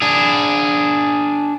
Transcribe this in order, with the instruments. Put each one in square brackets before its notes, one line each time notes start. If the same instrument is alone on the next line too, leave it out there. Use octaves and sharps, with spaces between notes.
[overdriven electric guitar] D4 G#4